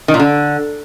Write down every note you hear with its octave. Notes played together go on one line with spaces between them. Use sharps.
D#3
A#2
D3